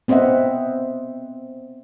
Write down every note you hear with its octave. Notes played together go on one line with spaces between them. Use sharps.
B3 C4 C5 D#5 E5 F#5